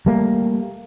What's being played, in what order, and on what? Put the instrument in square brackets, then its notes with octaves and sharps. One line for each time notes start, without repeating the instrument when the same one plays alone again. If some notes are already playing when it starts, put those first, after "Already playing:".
[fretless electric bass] G3 A3 A#3